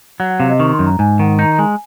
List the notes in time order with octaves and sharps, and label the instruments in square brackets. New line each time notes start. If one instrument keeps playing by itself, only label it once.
[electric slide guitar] F#3 [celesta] F#5
[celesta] F#5
[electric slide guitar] C3 [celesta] F5
[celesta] D#5
[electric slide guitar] D#3 [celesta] C#6
[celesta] C6
[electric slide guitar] F#2
[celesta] A#5
[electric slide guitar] G#2 [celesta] G#5
[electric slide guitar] D#3 [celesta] F#5
[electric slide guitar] D#4 [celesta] A#5
[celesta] A#5
[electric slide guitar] G#3 [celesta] G#5